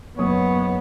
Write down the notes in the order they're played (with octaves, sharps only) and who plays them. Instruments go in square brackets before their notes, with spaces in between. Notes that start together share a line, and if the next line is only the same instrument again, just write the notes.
[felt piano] F#1 D#6 [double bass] B3 [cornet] C#5